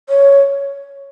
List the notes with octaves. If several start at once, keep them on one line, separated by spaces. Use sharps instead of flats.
C#5